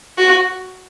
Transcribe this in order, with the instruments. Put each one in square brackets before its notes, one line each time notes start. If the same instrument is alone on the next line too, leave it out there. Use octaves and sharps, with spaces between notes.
[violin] F#4